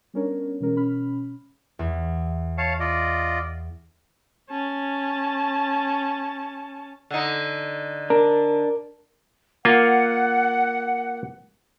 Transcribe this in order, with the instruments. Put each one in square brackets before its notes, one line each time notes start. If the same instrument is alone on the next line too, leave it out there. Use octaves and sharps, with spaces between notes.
[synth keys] G3 B3 C#4 D4 A#4 C#5
B2 E3 G#3 C#4 A#4
B2 C#4 B5 F6
[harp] E2
[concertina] C#5 F5 A5
F4 D5 D#5
[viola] C#4 A5
[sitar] D3 D#4
[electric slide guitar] D4 [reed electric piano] A#4
[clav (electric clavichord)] A#3 F4 [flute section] F#5